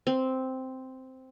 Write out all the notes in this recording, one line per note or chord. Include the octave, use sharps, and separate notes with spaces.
C4